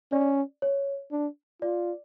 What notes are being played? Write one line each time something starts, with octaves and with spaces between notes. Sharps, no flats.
C#4 D5
C#5
D4
F4 D5